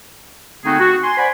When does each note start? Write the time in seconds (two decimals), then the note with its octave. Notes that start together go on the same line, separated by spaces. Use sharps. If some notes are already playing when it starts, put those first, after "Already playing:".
0.64 D3 A3 C4 D#4 F#4 G#4
0.79 F#4
1.03 G#5 C6
1.17 C5 D5 F#5 G#5 B5